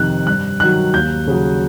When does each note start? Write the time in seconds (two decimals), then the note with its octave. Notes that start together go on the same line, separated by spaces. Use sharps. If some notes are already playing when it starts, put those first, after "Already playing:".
Already playing: F2 C3 D#3 F#6
0.26 G2 F#6
0.60 D#3 F#3 F#6
0.94 D#2 G6
1.27 C#3 F#3